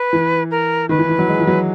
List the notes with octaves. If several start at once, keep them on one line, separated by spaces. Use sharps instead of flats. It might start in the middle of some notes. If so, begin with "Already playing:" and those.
Already playing: B4
E3
A#4
D#3 B4
E3
E3
F#3
G#3
E3
F#3